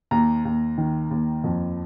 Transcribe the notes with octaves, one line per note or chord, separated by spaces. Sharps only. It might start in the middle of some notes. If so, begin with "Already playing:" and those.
D#2 A#5
D#2
D#3
D#2
F2